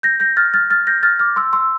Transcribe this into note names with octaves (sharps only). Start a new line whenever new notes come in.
G6 A#6
G6 A#6
F6 A6
F6 A6
F6 A6
G6 A#6
F6 A6
D6 F6
C6 E6
C6 E6